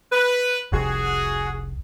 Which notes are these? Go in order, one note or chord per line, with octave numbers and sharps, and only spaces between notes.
B4
F1 C2 F#4 G#4